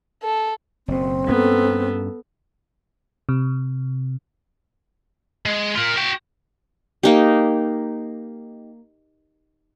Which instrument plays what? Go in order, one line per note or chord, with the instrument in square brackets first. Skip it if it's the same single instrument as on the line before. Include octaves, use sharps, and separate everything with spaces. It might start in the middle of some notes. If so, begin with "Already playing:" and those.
[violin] A4
[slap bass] F#1 B2 [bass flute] C4
[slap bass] G2 A#3 C#4 [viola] B3 A4
[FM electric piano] C3
[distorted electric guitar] G#3
F4 A#4
F#4 G5
[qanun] A#3 D#4 G4